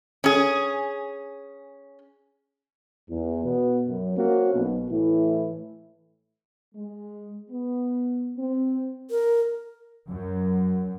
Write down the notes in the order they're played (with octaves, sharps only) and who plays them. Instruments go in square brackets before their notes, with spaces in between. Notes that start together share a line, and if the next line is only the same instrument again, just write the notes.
[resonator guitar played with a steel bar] C#4 G#4
[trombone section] E2
B2 B3
F#2
A#3 C4 C#4 F#4
B1 B2
A2 E3 E4
[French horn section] G#3
B3
C4
[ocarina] A#4
[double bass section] F#2